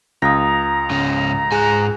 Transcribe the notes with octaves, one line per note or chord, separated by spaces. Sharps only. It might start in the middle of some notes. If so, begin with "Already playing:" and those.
C#2 F5 A#5 D#6 A#6
G#2 C#3 C#4
G#2 G#4 G#5 F#6